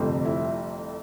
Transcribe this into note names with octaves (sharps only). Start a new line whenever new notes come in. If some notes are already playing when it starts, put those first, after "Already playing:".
Already playing: G1 F2 C3 F3 A3
E4